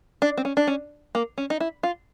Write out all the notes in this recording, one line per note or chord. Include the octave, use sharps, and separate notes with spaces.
D4
C4
C#4
D4
C#4
A#3
C#4
D#4
E4
F4